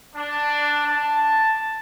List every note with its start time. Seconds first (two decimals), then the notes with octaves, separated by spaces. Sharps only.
0.16 D4
0.87 A5